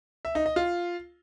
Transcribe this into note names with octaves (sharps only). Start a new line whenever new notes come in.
E5
D#4
D#5
F4